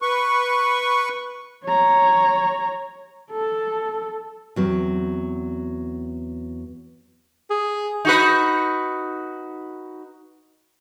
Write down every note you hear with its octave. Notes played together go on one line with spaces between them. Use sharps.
B4 C#6
C#5 A#5
A4
E2 F#3 C4
G#4
D#4 F#4 B4